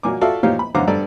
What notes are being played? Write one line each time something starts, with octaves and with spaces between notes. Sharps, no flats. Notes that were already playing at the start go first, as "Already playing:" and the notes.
A#2 F#3 A#3 G#5 D6
F4 F#4 A4 D5 E5 F5
A#2 F3 D#4 G4 C#5 F5
B5
F#2 D3 C5 F5 A#5 D6
G2 A4 C5 D5